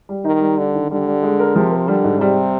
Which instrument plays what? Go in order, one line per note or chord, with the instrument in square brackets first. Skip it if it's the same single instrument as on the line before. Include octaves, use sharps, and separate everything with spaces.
[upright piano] G3
[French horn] D#3 [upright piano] D#4
[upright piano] G3
[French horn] D3 [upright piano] D4
[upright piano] D#3
[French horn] D3 [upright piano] G3
[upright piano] G3
G#3
A#4
[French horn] C3 [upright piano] F3
[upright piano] A#4
[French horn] D3 [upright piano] G3
[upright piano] G#2
[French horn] C3 [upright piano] G3